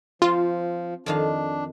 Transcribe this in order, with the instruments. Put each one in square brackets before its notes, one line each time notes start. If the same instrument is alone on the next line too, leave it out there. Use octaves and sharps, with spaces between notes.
[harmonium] F3 [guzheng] C4 F5 [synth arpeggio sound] F4
[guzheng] F2 D#3 F5 [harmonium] D4